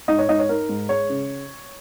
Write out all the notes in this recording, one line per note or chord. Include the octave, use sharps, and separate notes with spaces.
G#2 D#4 D#5
C#5
G#2 D#4 D#5
C#5
D#4 A#4
G#2
G#3 C#5
C#3